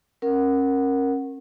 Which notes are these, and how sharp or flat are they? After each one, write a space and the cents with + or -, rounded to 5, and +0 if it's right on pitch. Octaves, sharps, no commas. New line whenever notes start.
C#4 -30 A#4 +0 F#5 +0